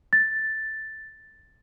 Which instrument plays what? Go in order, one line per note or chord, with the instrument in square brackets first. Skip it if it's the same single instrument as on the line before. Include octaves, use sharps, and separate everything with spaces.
[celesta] A6